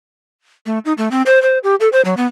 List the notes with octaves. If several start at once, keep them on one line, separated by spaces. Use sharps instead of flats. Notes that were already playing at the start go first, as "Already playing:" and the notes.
A3
D#4
A3
C4
C5
C5
G4
A4
C5
F#3
B3